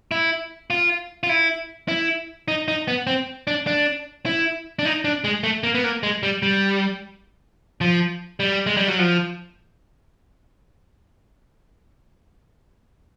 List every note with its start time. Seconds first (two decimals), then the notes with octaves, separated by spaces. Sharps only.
0.11 E4
0.70 F4
1.23 F4
1.29 E4
1.88 E4
2.48 D#4
2.68 D#4
2.88 B3
3.07 C4
3.47 D4
3.67 D4
4.26 E4
4.79 D4
4.85 D#4
5.05 D4
5.24 G#3
5.43 A3
5.64 A#3
5.75 B3
5.84 A#3
6.03 G#3
6.23 G3
6.43 G3
7.81 F3
8.40 G3
8.66 G#3
8.77 G3
8.88 F#3
8.99 F3